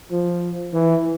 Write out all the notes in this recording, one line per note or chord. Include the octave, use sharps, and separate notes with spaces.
F3
E3